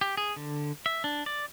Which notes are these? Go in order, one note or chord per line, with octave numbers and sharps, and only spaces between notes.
G4
G#4
D3
E5
D4
D5